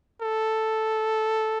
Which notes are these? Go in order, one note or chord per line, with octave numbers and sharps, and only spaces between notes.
A4